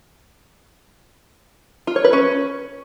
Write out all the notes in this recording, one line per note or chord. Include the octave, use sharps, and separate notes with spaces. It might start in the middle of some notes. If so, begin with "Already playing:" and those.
F4
C#5
B4
C#4